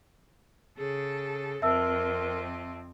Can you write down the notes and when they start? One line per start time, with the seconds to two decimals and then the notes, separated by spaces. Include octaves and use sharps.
0.78 C#3 G#4 A4
1.62 F2 C4 A#4 E5 A5 E6